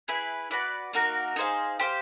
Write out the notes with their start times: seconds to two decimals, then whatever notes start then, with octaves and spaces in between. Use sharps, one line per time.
0.08 E4 G#4 B4
0.51 F#4 B4 D5
0.93 A#3 D#4 F#4 A#4
1.36 D#4 G#4 C5 F5
1.79 G4 C5 F5